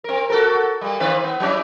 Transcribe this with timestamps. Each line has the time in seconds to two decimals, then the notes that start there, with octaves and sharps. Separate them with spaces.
0.04 C4 A#4
0.30 F#4 A4 A#4
0.81 G3 A#3
1.00 D#3 C4 B4
1.24 B3
1.40 F#3 C#4 E4